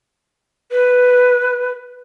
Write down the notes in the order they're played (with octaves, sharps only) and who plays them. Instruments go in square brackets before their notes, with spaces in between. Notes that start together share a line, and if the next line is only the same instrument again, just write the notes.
[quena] B4